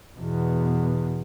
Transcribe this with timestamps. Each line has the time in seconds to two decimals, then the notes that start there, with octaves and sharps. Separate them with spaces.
0.18 E2 B2